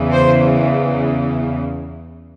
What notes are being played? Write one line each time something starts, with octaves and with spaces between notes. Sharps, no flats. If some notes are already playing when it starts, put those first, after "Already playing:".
Already playing: E2 C#3 E3
C5